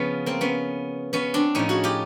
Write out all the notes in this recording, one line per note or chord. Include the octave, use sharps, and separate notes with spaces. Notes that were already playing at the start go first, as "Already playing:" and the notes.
Already playing: C#3 F3 B3 C#4
A#3 C4
B3 C#4
B3 C#4
C4 D4
A2 F3 C#4 D#4
F#4 G#4
F4 G4